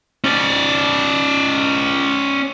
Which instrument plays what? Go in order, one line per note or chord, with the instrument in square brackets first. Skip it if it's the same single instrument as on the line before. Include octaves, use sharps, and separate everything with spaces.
[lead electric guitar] C#4 D5